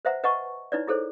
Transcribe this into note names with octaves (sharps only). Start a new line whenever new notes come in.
B4 C5 E5 F#5 A#5
B4 D#5 F#5 A5 C#6
D#4 E4 B4 C#5 D5
E4 G#4 A4 C5 C#5